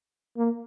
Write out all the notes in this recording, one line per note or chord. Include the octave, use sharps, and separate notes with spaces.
A#3